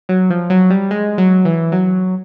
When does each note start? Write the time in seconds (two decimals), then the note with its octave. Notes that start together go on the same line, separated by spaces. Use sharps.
0.09 F#3
0.30 F3
0.50 F#3
0.70 G3
0.91 G#3
1.18 F#3
1.45 E3
1.72 F#3